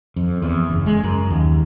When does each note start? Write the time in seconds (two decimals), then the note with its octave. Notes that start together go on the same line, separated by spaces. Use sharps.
0.16 F2
0.42 E2
0.69 F#1
0.86 G#3
1.03 F#2
1.30 D#2